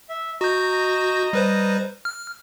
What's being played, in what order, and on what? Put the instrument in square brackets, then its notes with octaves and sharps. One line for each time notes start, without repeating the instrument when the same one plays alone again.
[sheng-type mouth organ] E5
[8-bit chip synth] F#4 G6 [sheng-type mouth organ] D#5 A#5
[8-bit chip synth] G3 B4 C5
F6